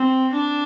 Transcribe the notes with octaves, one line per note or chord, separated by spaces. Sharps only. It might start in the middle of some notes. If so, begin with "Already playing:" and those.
Already playing: C4
D4